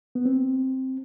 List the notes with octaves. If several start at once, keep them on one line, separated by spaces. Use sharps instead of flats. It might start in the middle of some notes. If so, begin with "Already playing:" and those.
B3
C4